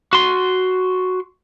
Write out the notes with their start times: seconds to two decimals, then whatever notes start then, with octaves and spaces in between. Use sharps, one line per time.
0.13 F#4 C6